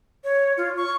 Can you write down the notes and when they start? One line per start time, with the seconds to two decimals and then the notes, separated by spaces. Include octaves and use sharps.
0.24 C#5
0.57 F4
0.77 C#6